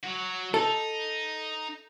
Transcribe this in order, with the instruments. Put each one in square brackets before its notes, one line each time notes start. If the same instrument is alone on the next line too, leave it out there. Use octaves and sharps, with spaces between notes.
[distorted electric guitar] F#3 F#4
[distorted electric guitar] D#4 [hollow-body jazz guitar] A4